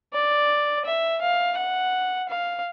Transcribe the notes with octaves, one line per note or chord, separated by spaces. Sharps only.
D5
E5
F5
F#5
F5